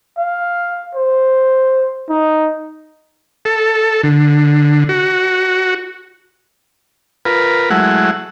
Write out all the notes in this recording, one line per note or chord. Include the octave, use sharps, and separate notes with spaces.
F5
C5
D#4
A4
D3
F#4
F4 A#4 B4
F#3 G#3 A3 E4 F#5